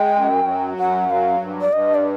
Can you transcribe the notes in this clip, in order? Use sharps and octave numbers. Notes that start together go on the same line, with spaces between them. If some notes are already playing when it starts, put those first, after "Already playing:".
Already playing: G#3 G5
F#2
F#3
F#2 F#5
F#3 F5
G2
D5
G2 D#5
D5